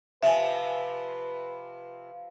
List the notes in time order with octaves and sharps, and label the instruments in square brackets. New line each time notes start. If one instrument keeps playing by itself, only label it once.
[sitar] C3 F3 [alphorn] B4 [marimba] E5 G#5